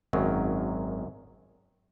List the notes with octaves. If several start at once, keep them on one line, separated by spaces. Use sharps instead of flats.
G#1 F#2 D#3 F#3